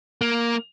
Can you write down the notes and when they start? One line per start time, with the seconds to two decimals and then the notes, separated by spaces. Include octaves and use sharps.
0.21 A#3